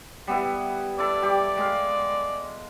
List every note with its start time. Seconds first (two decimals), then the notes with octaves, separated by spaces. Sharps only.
0.27 G3 B3 E4
0.99 E4 A4 D5
1.22 G3 G4
1.57 G#3 F5